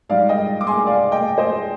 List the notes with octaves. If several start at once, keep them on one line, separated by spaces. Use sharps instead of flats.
G#2 G3 D5 F5
D#5 G5
D6
G#5 C6
D5 F5
D#5 G5
C5 D#5